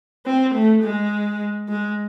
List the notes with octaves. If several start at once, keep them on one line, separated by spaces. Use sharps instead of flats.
C4
A3
G#3
G#3